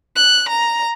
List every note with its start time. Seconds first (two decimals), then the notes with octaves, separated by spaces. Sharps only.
0.16 F#6
0.49 A#5